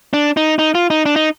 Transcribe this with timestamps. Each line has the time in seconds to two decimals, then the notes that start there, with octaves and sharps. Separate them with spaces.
0.13 D4
0.37 D#4
0.59 D#4
0.75 F4
0.90 D#4
1.06 D4
1.16 D#4